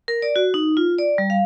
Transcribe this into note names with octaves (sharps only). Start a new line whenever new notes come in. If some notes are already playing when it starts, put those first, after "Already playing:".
A#4
D5
F#4
D#4
F4
D5
G3
F5